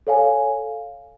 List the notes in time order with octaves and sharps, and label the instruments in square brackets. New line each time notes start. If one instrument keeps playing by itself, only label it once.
[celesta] A4 C#5 F5 G#5